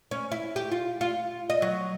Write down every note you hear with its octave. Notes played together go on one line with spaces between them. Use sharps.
C#4
E4
G4
F4
F4
D#5
F#3